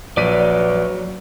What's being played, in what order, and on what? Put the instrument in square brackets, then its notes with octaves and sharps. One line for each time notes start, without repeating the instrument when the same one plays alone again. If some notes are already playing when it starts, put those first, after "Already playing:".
[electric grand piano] A#1 B6 D#7 [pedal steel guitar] F#3 [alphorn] B4 [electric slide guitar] D5